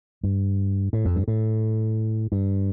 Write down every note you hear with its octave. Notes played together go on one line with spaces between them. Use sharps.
G2
A2
F2
G2
A2
G2